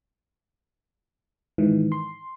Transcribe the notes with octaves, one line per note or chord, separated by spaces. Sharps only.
G#2 D#3 E3
C6